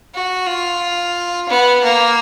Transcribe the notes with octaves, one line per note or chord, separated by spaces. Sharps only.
F#4
F4
B3
A#3